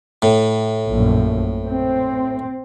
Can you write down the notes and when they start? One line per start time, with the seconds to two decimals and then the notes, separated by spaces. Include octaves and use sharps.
0.22 A2
0.88 A#1 F#2
1.67 C4